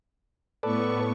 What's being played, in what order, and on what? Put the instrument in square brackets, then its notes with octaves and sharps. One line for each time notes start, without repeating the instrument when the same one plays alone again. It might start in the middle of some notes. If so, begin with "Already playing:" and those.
[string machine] A2 B3 C#6 [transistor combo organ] A4 B4 D5